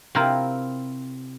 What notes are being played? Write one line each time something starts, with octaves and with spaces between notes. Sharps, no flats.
C3 C4 E4 F4 A#4